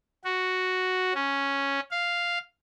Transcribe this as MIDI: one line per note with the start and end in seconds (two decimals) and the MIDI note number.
0.24 1.13 66
1.14 1.80 61
1.91 2.39 77